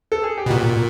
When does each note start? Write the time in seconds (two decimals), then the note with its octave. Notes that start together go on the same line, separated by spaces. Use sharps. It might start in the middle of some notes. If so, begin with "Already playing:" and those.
0.12 A4
0.23 G#4
0.38 G4
0.46 B2
0.50 A#2 F#4